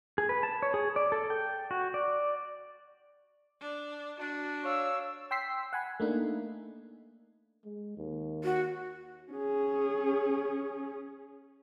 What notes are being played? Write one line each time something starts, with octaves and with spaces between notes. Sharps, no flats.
G#4
B4
A5
C#5
G#4
D5
A4
G5
F#4
D5
D4
D4 F#4
C#5 F5 E6
G5 C6 E6 B6 C7
F#5 G#5 B5
A3 A#3 D4 D#4
G#3
D#2
F#4
C#4 G#4